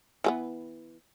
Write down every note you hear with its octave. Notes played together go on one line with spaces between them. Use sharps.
E3 G#3 B3